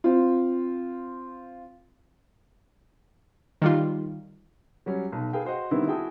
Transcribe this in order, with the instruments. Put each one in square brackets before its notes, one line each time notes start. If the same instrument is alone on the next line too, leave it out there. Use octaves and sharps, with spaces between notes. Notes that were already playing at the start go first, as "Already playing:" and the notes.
[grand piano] C4 F4
[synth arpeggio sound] D#3 G3 F4
[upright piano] F#3 G3 C#4
B1 B2
G#4 A4 B4 F5 G5
F#4 C5 D#5 F#5
D3 D#3 G3 B3 C4 E4
E4 F#4 G#4 G5 A5 D#6